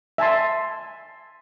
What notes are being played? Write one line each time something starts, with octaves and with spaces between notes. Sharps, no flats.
E5 G#5 A5 C6